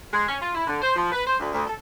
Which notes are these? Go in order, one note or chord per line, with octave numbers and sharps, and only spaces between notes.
G#3
C#4
F4
E4
D3
C5
F3
B4
C5
D2
D2
A4